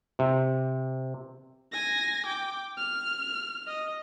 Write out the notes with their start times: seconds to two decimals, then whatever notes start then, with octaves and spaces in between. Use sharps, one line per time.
0.19 C3
1.72 G#5 A#6
2.26 G5 D6
2.77 F6
3.67 D#5